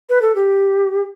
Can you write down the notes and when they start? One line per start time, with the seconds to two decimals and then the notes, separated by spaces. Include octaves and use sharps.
0.09 B4
0.22 A4
0.35 G4